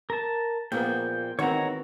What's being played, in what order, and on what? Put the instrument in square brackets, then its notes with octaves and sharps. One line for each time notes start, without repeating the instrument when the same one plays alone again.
[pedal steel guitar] A#4 A5
[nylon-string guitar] A#2 F3 G#4 [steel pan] A#3 B3 [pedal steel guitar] G5
[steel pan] D#3 C4 [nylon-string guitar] E3 G#3 F#4 [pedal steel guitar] C#5 A#5